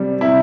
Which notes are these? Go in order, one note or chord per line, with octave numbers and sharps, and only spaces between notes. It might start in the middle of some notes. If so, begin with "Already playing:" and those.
Already playing: C3 G3
C3 E4